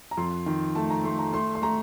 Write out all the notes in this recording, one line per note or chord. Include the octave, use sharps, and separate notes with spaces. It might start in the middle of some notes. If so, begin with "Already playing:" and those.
A#5
F2 C6
D#3
A3 A5
A#5
A3 C6
A#5
A3 C6
C6
A3 A#5